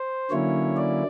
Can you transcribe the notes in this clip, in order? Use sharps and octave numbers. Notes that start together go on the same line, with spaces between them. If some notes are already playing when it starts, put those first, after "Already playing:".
Already playing: C5
D3 F#3 A#3 C#4 E4 C#5
D5